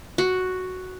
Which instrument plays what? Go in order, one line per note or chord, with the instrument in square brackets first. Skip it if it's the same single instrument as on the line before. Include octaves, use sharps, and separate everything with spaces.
[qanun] F#4